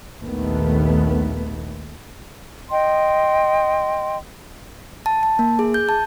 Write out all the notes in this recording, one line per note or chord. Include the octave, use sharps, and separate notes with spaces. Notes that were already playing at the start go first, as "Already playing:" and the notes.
A#1 D#2 D#3 A3 B3
D#5 G5 C6
A5
A5
A#3
G#4
G6
A5